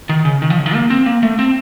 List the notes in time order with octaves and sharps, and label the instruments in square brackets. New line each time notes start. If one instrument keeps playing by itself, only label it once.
[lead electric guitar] D#3
C#3
D#3
F3
C#3
D#3
A#3
C4
A#3
A3
C4